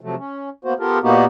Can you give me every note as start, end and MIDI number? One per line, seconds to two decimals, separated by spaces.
0.01 0.15 48
0.01 0.15 53
0.01 0.15 54
0.01 0.15 57
0.19 0.50 61
0.65 0.74 58
0.65 0.74 59
0.65 0.74 66
0.65 0.74 72
0.79 0.99 59
0.79 0.99 65
0.79 0.99 67
0.79 0.99 69
0.79 0.99 70
1.03 1.25 46
1.03 1.25 58
1.03 1.25 59
1.03 1.25 63
1.03 1.25 66
1.03 1.25 67